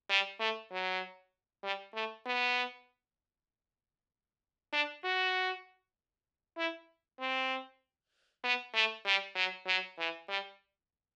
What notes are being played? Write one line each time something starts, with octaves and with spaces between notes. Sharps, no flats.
G3
A3
F#3
G3
A3
B3
D4
F#4
E4
C4
B3
A3
G3
F#3
F#3
E3
G3